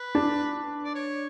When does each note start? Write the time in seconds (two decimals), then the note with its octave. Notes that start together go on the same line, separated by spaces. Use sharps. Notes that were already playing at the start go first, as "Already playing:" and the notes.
Already playing: B4
0.15 D4
0.84 D5
0.95 C#5